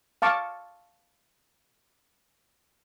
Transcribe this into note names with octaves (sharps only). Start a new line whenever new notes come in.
F5 A5 C#6 D6